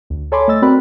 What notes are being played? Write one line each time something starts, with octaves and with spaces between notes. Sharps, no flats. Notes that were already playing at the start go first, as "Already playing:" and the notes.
D2
A4 C#5 G#5 B5 C6 D6
A3 D#5 E6 A6
C4 F#4 A#4 D5 B5 F#6